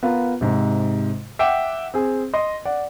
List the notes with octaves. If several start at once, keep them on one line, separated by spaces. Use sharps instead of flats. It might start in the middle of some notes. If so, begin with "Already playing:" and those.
B3 F4 A#4
G#2 C3
E5 F#5 G5 D6
C4 G#4
D#5 C6
D5 F#5